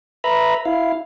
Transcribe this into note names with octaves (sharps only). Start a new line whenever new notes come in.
B4 E5 A#5 B5
E4 F5